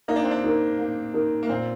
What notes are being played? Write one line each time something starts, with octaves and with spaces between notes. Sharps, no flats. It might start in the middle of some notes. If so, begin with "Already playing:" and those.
A#3 D#4
D4
C4
D4
D#4 A#4
A#3
D#4 A#4
A#3
A#2 C4